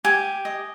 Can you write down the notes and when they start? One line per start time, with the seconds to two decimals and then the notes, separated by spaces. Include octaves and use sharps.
0.04 G4 G#5
0.45 D#5